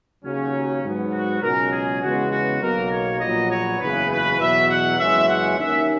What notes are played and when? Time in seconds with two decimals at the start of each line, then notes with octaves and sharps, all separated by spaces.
0.24 D#2 C#3 F#3 C#4
0.83 G#2 F#3 B3
1.13 F#4
1.43 C#2 B2 F#3 C#4 A#4
1.72 G#4
2.02 E2 C#3 G#3 B3 F#4
2.32 F#4
2.61 B1 B2 F#3 A#3 A#4
2.91 C#5
3.21 A#1 A#2 F#3 B3 D#5
3.50 C#5
3.80 F#1 E2 C#3 B4
4.10 B4
4.40 E2 B2 F#3 E5
4.69 F#5
4.99 F#1 F#2 E3 G#3 C#4 E5
5.29 F#5
5.58 D#2 D#3 A#3 C#4 E5